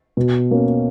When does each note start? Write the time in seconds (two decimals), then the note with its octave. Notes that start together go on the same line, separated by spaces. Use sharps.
0.17 B2
0.51 A#3 C#4